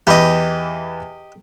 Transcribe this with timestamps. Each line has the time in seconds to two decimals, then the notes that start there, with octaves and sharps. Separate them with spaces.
0.07 E2 E3 G4 D#5 B5